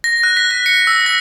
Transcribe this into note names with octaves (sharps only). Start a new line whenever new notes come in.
A#6
F#6
B6
F#6
C#7
E6
A#6